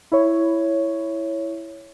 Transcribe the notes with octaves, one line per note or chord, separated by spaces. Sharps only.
E4 C#5